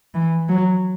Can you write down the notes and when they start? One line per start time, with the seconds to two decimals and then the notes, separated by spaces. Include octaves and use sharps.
0.14 E3
0.49 F#3